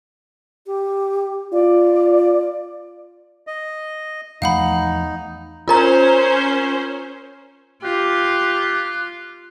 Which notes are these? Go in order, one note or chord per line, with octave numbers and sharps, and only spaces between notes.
G4
F4 D5
D#5
E2 F3 A3 D#4 F5 F#5 B5
C#4 F4 A#4 C5 A#5
F4 G4 F#6